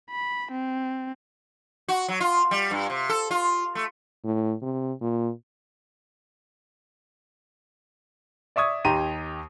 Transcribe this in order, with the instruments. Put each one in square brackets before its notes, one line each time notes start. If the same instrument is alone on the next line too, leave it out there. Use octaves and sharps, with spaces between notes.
[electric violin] B5
C4
[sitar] F#4
F#3
F4
G3
G2
C3
A4
F4
A3
[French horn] A2
C3
A#2
[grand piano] D5 E5 C#6 D#6 G#6
D#2 D#4 G4 A#5 C6 D#7